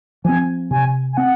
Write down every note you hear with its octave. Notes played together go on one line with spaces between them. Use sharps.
F3 C4 G#5
C3 G#5
G#5
C4 F#5